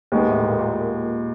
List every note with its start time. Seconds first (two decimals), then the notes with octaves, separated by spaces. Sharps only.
0.12 D#2 D#3 G#3 B3
0.28 A2
0.43 A#2
0.58 A#2